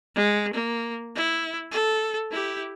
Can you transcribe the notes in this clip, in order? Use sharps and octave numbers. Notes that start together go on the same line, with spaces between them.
G#3
A#3
E4
A4
E4 G4